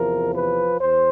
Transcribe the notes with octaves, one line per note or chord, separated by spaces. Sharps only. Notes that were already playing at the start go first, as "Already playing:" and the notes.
Already playing: E2 C3 F3 A#4
B4
E2 C5